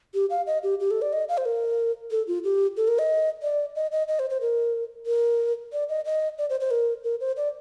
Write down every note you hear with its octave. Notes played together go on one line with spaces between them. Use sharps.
G4
F5
D#5
G4
G4
A4
D5
D#5
F5
C5
A#4
A4
F4
G4
A4
A#4
D#5
D5
D#5
D#5
D#5
C5
C5
A#4
A#4
D5
D#5
D#5
D5
C5
C5
A#4
A#4
C5
D5